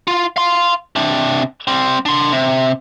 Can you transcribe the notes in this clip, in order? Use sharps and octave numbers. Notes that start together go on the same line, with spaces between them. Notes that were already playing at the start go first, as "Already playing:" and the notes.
F4
F5 C6
C3 D4
G3 C4
D4 C6
C3